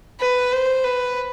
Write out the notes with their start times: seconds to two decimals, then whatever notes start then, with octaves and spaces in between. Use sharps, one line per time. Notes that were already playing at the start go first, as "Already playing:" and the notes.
0.20 B4
0.52 C5
0.84 B4